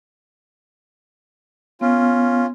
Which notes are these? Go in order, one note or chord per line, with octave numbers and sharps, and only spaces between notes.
B3 C#4 F4